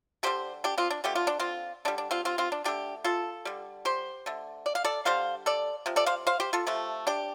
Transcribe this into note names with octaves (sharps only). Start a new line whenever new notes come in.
D3 G3 G4 C5
D4 G4
C4 F4
D4
D3 F3 A3 G4
F4
D4
C4 F4
D3 G3 D4
D4
C4 F4
C4 F4
C4 F4
D4
D3 A3 D4 G4
F4 A4
D3 G3
G4 C5
D3 A3
D5
F5
A4 D5
D3 G3 C5 F5
A4 D5
C3 F3
A4 D5
C5 F5
C5 F5
G4 C5
F4 A4
C3 F3 A3
D4 G4